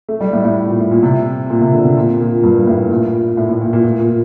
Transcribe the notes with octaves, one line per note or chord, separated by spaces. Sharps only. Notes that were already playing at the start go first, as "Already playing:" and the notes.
A3
G3
A2
A2
A#2
A2
A#2
C3
A#2
C3
D3
C3
A#2
A#2
G2
A2
A#2
A2
A2
A#2
A#2
A#2
A#2